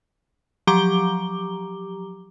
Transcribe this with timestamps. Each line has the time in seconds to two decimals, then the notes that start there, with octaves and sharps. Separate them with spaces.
0.67 F3 F#3 G4 A#5 D6 G7